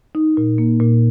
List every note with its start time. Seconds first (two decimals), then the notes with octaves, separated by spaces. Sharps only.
0.15 D#4
0.37 A#2
0.58 A#3
0.80 A#2